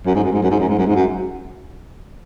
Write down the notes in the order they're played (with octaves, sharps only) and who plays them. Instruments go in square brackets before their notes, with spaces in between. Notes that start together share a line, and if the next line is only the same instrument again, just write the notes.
[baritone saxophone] F#2
G#2
F#2
G#2
F#2
G#2
F#2
G#2
F#2
G#2
F#2